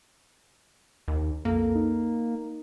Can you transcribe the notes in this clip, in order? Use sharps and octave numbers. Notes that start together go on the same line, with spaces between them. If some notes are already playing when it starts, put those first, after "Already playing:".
D#2
B1 F2 A#3 A4
D#4